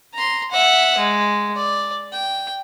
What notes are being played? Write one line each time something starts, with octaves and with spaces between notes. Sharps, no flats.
A#5 C6
E5 F#5
G#3
D5
G5